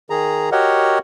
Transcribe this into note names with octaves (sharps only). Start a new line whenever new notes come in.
D#3 G#4 A#5
F#4 G4 A#4 C#5 D#5 F#5